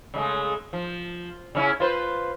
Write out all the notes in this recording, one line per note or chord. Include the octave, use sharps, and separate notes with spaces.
C#3 G#3 A3
F3
C#3 C#4 E4
F4 B4 C5